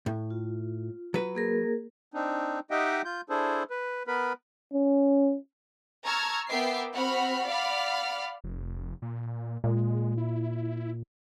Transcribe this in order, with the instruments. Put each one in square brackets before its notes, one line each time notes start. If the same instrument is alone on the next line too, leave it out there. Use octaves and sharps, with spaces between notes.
[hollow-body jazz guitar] A2
[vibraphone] F4
[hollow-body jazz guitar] F#3 B4
[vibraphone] A#3 G#4 A#4
[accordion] C4 D4 D#4
D#4 G4 D#5 E5 F#5 G5
F4 G6
D4 E4 G#4 A4 C5
B4
B3 A#4 B4 B5
[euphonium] C#4
[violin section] A5 A#5 C#6 E6 F6 G#6
B3 A#4 E5 G5 D6 C7
C4 F#4 F#5 B5 F6
D5 F5 F#5 B5 F6
[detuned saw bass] F1
A#2
[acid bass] A#2 [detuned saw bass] G#3
[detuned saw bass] E4